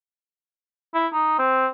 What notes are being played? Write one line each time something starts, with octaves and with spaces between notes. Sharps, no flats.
E4
D#4
C4